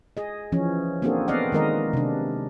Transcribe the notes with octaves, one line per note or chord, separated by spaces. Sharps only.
G#4 D#5
E3 F3 C#4
A#3 C4 D4 F#4 G#4 A4
B3 C4 D5 D#5 F5 F#5
D#3 G#3 A#4 D#5
C3 D4